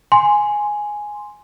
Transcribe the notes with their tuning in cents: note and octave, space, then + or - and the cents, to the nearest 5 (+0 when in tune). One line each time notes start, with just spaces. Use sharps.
G#5 +0 C6 +0